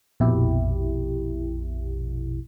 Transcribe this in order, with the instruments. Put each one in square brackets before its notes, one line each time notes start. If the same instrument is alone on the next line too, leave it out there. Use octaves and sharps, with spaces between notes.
[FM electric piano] A#1 F2 B2 E4 G4